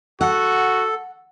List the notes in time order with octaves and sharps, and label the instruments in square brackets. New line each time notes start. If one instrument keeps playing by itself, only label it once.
[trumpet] F#4 [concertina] A4 [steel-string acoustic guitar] F#5